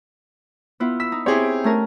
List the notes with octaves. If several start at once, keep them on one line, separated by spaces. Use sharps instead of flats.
B3 E4 F4
E6 B6
D#4
C4 E4 G4 G#4 C#5 G5
A3 C#4 A#4